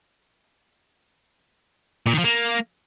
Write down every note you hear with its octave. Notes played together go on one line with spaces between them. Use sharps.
A#2
D#3
F3
A#3